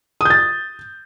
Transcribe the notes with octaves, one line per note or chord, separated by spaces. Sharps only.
D#6 G6 A6